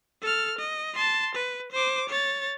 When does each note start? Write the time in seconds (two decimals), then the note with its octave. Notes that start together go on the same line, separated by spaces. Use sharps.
0.22 A4 F6
0.59 D#5
0.94 A5 C6
1.35 B4
1.72 C5 D6
2.09 C#5 A6